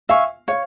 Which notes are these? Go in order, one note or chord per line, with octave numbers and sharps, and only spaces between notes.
E5 F5 G#5 C#6
C#5 F5